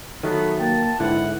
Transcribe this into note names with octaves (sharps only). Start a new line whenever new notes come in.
D#3 F#3 A3 B3
A#3 G5 A5
E2 G#2 D3 E4 F#5